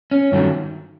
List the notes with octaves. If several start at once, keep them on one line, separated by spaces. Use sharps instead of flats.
C#4
G2 D#3 F#3 A3